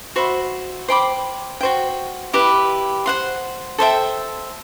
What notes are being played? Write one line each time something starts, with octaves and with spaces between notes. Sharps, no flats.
F#4 C5 E5 B5
C5 G5 B5 D6
F#4 C5 G5
E4 G4 B4
C5 F#5 C6
A4 C5 E5 G5